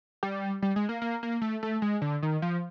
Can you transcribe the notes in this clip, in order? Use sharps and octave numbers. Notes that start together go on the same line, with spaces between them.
G3
G3
G#3
A#3
A#3
A#3
A3
A3
G#3
D3
D#3
F3